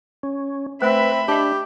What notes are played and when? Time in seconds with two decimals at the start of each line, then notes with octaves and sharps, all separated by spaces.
0.23 C#4
0.82 A3 C4 B4 E5 B5
1.28 D4 G4 D#5 A5